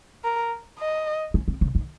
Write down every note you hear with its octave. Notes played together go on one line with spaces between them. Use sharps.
A#4
D#5
C#4
C4
C#3
D#3